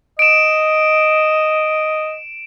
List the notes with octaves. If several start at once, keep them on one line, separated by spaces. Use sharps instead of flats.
D#5 D7 E7